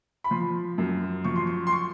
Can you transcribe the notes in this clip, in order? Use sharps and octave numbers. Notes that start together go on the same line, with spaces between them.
B5
F3 C6
F#2
F3 C#6
C6
C#6
C6
C#6